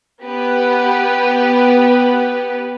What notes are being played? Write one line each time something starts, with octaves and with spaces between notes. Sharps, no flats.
B3 G4 B4